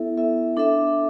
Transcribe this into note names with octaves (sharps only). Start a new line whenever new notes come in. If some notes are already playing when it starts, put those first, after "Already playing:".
Already playing: B3 E4 A4 E5
B3 E4 A4 E5
D4 A4 E5